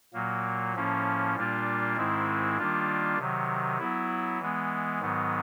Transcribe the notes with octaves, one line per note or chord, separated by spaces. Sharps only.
A#2 F#3 A#3
A2 F3 A#3 C#4
A#2 G3 A#3 D4 F4
G#2 D#3 G#3 C4 E4
D#3 G3 A#3 D4 F4
C3 D#3 F#3
F#3 B3 E4
E3 G#3 B3
G#2 D#3 F#3 B3